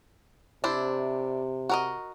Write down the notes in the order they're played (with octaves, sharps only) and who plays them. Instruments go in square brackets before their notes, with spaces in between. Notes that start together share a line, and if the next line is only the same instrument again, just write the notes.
[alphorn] C3 [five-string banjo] D4 E4 C5
[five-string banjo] F#4 A#4 D#5